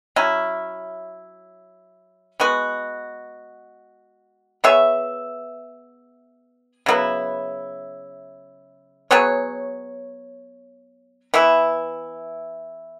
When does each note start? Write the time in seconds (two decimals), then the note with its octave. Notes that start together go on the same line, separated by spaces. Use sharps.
0.16 F#3 C#4 E4
2.40 G#3 B3 F#4
4.64 B3 G#4 C#5 E5
6.86 C#3 F#3 B3 E4
9.11 F#3 B3 G#4 C#5
11.34 E3 B3 E4